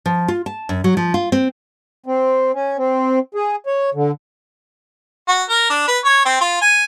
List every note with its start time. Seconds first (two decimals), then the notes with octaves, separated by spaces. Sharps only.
0.06 F3
0.28 F4
0.46 A5
0.69 F#2
0.84 F#3
0.97 F3
1.14 F4
1.32 C4
2.06 C4
2.54 C#4
2.78 C4
3.35 G#4
3.67 C#5
3.94 D3
5.28 F#4
5.50 A#4
5.70 D4
5.88 B4
6.05 C#5
6.25 C4
6.41 F4
6.61 G#5